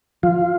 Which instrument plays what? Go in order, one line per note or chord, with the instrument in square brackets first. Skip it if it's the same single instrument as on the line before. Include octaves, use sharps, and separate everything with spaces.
[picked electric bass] F3 [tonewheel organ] F4